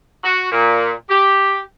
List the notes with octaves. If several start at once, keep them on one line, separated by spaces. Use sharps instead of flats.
F#4
A#2
G4